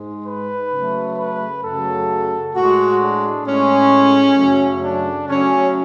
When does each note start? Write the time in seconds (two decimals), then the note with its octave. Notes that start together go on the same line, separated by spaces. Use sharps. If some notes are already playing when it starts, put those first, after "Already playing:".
Already playing: G#2 G#3
0.26 B4
0.73 C#3 F#3 A3
1.18 B4
1.64 F#2 C#3 F#3 A3 A4
2.55 A2 G#3 F#4
3.02 D4
3.46 A2 G#3 C#4
4.38 F#2 C#3 F#3 A3
4.84 D4
5.29 C#3 F#3 A3 C#4